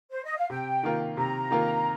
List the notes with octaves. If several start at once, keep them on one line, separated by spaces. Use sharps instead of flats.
C5
D#5
F5
C3 G5
D#3 A#3 F4 A#4
C3 A#5
D#3 A#3 F4 A#4